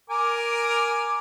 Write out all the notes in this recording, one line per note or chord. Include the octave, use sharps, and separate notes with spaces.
A#4 G#5 D6